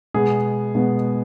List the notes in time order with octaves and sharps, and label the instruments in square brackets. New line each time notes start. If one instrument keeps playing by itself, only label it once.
[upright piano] B2 G#3 B3 G#4
B2 G#3 B3